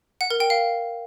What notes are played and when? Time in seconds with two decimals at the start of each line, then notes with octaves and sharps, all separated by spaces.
0.21 F#5
0.30 A#4
0.40 G5
0.50 F5